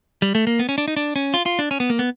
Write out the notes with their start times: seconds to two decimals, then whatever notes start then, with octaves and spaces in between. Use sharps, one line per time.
0.22 G3
0.35 A3
0.47 A#3
0.59 B3
0.69 C#4
0.78 D4
0.88 D#4
0.97 D4
1.16 C#4
1.34 F4
1.46 F4
1.59 D4
1.71 C#4
1.80 B3
1.90 A#3
1.99 B3